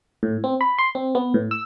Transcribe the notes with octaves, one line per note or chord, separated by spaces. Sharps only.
A2
C4
B5
C6
C4
B3
A2
E6